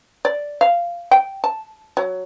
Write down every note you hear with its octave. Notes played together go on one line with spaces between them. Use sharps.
D5
F5
G5
A5
F#3